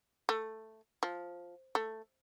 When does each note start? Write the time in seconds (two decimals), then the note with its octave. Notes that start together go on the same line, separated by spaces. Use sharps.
0.29 A3
1.03 F3
1.75 A3